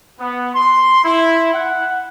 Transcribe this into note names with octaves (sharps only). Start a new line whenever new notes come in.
B3
C6
E4
F#5